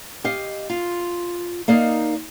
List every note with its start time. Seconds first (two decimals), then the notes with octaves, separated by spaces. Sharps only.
0.24 G4 D#5 F5
0.70 F4
1.68 A#3 D#4 D5 D#5 F5